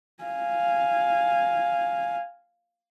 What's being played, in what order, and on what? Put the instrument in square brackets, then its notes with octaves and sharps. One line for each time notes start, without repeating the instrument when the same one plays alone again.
[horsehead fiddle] F5 G#5